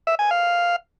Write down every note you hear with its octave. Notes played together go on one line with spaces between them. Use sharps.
E5
G#5
F5